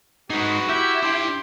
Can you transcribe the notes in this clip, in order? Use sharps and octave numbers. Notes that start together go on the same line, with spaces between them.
G#3 D#4 F#4 G#4 B4
E4 G4 E5
D4 G4 G5 C6